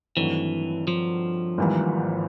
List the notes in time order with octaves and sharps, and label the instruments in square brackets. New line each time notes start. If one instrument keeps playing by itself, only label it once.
[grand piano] G2 D#3 F#3 A3 C4 [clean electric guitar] E3
[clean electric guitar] F3
[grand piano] G#1 G#2 E3 G3 A#3